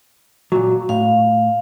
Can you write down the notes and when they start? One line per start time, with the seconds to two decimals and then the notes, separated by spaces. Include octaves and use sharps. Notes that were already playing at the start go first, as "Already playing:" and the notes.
0.52 A#2 F#3
0.89 A2 F5